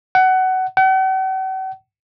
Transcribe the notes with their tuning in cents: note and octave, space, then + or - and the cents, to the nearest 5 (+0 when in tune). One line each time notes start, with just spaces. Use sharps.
F#5 +20
F#5 +45